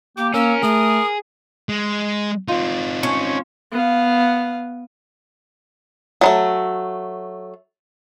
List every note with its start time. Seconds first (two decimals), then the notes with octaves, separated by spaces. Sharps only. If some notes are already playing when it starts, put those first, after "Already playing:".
0.17 A#3 G4 D6
0.34 A#3 C#4 A#4 E6
0.62 A3 G#4 D#6
1.69 G#3
2.48 C4 D#4 F4
3.03 C#4
3.72 B3 F5
6.21 F#3 G#3 A3